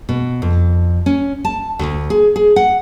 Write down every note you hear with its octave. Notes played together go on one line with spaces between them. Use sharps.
B2
F2
C#4
A5
D2
G#4
G#4
F#5